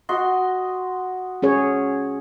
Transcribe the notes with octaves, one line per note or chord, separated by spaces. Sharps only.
F#4 D#5 C6
C#4 G#4 C#5